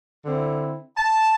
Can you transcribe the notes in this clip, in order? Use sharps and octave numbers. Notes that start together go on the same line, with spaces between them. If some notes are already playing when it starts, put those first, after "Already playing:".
D3 C4 E4
A5